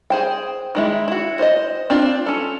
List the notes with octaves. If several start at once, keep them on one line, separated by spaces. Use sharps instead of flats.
G#4 C5 G5
D#3 G#3 E4
E4 F#4
C5 C#5 D#5
C4 D4 F4 D5
C#4 A4